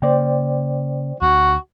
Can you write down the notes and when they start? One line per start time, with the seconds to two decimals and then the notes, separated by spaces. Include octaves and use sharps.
0.02 C#3 A#3 C5 D5 G5
1.22 D2 F#4